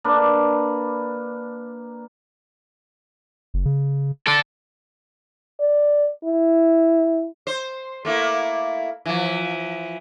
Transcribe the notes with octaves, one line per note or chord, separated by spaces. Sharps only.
A#3 D4 B4
F#1
C#3
A4 D5
D5
E4
C5
A3 A#3 E4
E3 F3